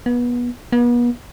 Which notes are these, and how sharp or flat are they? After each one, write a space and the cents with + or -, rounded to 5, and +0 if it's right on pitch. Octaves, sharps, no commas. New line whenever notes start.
B3 -25
B3 -40